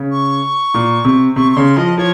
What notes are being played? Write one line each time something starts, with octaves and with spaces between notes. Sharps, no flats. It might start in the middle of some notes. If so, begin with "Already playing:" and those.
Already playing: C#3
C#6
A#2
C3
C3 C#6
C#6
C#3 C6
F3 D#5
F3 C#5